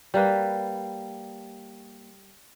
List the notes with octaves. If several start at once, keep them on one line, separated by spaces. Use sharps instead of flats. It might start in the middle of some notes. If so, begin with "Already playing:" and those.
G3 A#3 B4